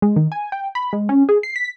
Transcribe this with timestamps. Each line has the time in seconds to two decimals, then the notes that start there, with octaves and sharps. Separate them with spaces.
0.02 G#3
0.16 D#3
0.32 G#5
0.52 G5
0.75 B5
0.93 G#3
1.09 C#4
1.29 G#4
1.43 C7
1.56 B6